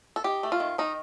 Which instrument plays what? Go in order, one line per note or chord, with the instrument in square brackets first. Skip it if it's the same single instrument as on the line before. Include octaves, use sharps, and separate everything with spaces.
[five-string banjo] A4
D#4 G4
A3
F4
D#3
D#3 D#4